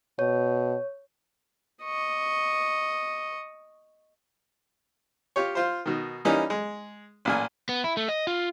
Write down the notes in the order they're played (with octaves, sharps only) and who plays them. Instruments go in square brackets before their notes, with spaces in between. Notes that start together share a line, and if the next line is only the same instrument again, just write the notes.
[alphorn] B2 [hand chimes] C#5
[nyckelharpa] D#5 C#6
[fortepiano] F4 G4 C#5
F4 C5
B2 D#3
E3 G3 A#3 C#4 D#4
G#3
A1 A#2 G#5
[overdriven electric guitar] B3
E4
A3
D#5
F4